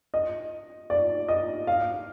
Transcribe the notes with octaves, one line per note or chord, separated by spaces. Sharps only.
D#5
D5
D#5
F5